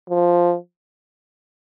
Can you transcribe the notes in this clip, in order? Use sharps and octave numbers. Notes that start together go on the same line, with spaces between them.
F3